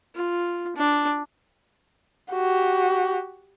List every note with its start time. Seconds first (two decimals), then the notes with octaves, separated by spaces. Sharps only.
0.15 F4
0.76 D4
2.31 F#4 G4